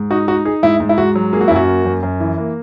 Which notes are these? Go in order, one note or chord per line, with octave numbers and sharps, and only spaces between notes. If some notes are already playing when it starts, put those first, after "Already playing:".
Already playing: G#2
D#4 F#4
D#4 F#4
D#4 G#4
G#2 E4
G#2
E4
G#2 F#4
F#3
A#3 G#4
F#4
E4
F#2
F#4
A#3
F#2
F#2
E3
A#3